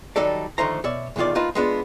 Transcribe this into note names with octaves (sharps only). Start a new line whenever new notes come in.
D#3 F#3 G3 D#4 A4 D5
D3 D#3 F3 A3 C5 A#5
B2 C#5 D5 E5
B1 E2 A2 D#3 F4 D5
A#3 D#4 F4 B4 D#5 A5
G#3 B3 D4 F4